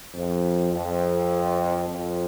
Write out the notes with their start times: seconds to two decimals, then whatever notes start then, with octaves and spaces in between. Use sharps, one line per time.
0.14 F2
0.72 F2
1.89 F2